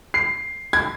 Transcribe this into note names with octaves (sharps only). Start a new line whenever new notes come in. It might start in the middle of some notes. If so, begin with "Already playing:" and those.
C7
G#6